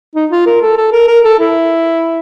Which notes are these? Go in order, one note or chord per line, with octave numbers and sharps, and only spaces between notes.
D#4
F4
A#4
A4
A4
A#4
A#4
A4
E4